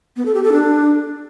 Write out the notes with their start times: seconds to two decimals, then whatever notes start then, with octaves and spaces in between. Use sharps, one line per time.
0.16 B3
0.25 A4
0.34 G4
0.43 A4
0.52 D4